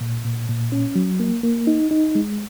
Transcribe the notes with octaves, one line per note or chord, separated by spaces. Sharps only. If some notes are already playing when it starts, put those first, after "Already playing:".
A#2
A#2
A#2
C#4
F#3
A#3
A#3
D#4
D#4
G#3